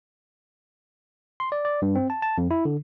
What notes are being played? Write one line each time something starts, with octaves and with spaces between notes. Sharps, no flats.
C6
D5
D5
G2
C4
A5
A5
F2
E4
D3